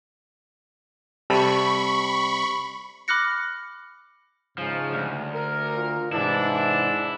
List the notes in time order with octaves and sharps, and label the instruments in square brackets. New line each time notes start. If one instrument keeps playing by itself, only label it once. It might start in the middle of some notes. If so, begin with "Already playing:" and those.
[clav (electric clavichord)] C3 G3 A4 [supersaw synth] B5 C#6
[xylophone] B5 D6 F6 F#6 A#6 C#7
[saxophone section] G#2 C#3 [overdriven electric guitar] F3
[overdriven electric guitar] D2
[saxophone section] A#4
[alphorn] F4
[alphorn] G#2 [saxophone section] C3 E3 [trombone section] D4 [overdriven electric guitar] E4